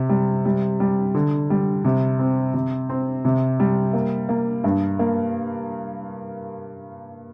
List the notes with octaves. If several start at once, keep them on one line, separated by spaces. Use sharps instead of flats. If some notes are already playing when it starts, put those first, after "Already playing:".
Already playing: C3
G3
G3
G3
D3
G3
C3
C4
C3
C4
C3
G3
A#3
A#3
G2
A#3